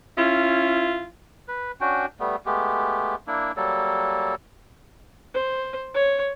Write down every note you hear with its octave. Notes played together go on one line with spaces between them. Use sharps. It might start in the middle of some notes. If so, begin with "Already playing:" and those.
C#4 E4 F4
B4
C#4 D4 F#4 G5
G3 A3 B3
G#3 A3 B3 G4
A#3 D4 E4
F#3 G3 A#3 A4
C5
C#5